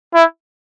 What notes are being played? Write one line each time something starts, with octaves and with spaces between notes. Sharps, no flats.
E4